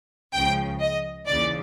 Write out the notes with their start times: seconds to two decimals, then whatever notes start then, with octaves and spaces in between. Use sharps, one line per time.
0.34 C#2 C#3 F3 G5
0.81 D#5
1.27 D#2 C#3 E3 D5